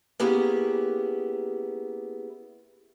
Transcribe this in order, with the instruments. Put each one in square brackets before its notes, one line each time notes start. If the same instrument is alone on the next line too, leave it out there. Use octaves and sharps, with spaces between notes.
[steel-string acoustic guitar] A#3 B3 C#4 E4 G4 G#4